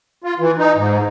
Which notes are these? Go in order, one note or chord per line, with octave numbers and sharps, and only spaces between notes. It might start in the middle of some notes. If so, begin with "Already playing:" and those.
F4
E3
D#4
G#2